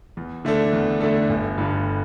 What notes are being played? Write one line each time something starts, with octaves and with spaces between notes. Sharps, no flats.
E2
D3 A3 D4 A4
E2
D3 A3 D4 A4
G1
G2 D3